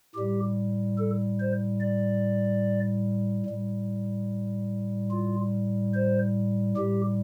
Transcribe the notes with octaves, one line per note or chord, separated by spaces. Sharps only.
A2 G3 G4
A4
C5
D5
A2 G3
F4
C5
A2 G3 G4